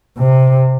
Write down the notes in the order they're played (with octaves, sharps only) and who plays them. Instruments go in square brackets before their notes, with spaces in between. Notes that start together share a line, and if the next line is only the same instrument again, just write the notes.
[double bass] C3